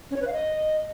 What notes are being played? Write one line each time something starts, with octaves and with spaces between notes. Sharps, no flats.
C#4
C#5
B4
F5
D#5